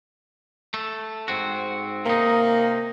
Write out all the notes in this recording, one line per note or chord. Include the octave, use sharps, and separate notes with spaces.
A3
G#2 C4 F#4
C3 A#3 D#4